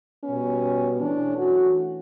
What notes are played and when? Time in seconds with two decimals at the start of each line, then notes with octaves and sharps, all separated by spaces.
0.24 B2 G3 B3 C#4
1.01 E3 A3 C#4 D4
1.39 F#4